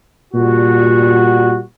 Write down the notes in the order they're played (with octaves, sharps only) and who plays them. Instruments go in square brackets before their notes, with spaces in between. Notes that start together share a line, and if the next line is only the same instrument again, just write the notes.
[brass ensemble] A#2 G3 F#4